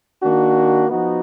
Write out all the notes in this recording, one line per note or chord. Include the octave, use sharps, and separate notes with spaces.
D#3 A#3 D4 F#4
F3 B3 D#4 F#4